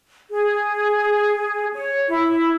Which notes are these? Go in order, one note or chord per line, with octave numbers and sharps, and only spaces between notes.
G#4
C#5
E4